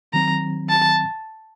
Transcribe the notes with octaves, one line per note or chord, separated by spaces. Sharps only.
D#3 F#3 C4 A#5
A5